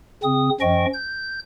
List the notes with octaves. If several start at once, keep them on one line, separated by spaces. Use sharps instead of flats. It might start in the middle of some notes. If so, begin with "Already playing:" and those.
C#3 C4 D#6
F#2 F3 C#4 D#5 G5 C#6
G6